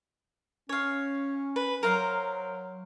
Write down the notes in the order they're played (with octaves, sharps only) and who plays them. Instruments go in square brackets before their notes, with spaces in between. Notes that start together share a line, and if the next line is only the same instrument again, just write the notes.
[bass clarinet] C#4 [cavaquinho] C#5 F5
[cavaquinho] B4
[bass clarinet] F#3 [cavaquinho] A#4 C5 F5